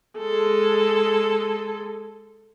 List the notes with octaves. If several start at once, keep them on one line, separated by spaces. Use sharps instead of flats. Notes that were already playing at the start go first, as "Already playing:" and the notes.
G#3 A4